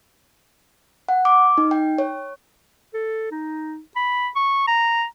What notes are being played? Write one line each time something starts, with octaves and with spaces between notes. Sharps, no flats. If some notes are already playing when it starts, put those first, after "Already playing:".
F#5
D6
D#4
G5
C#5
A4
D#4
B5
C#6
A#5